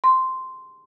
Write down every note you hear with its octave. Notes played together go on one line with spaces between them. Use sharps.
C6